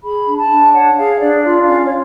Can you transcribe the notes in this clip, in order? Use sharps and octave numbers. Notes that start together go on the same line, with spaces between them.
G#4 B5
D4
A5
D4
C#5 F#5
G#4 F5
D4 D5
F4 D5
F5
C#4
C#5